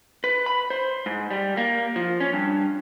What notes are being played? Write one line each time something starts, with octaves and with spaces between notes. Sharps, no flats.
B4
B5
C5
G#2
G3
A#3
F3
C#4
G2